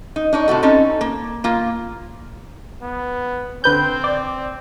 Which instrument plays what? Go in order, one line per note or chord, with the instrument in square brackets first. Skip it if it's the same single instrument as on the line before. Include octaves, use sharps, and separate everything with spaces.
[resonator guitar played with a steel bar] D#4
D4 D#4 C#5
A2 C3 F#4 A4
C4 C#4 D#4 A4
A#3
A#3 F4
[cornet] B3
[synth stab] D3 B4 G6 [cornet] C4
[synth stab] D5